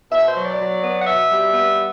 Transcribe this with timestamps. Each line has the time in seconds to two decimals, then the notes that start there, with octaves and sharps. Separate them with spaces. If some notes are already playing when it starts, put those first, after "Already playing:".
0.12 B2 E5
0.28 C5
0.35 F#3
0.43 D5
0.60 F#3
0.83 B3
1.01 F#5
1.06 B2 E5
1.30 G3
1.54 B3